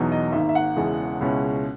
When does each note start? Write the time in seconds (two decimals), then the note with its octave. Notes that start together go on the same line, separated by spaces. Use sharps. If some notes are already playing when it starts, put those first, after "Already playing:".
Already playing: E2 B2 F#3 B3 D#4
0.12 D#5
0.32 G#1 G#2 D#3 A#3 E5
0.49 E5
0.55 F#5
0.76 E1 E2 C#3 E3 G#3
1.21 C#2 B2 G#3 C#4 E4